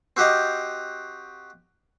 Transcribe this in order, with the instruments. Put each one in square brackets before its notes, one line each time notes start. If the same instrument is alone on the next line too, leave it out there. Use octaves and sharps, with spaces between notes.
[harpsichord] C4 F#4 G4 D#5 F5